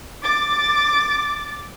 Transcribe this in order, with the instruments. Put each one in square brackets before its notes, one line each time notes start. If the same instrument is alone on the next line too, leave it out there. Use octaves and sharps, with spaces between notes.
[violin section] D6 A6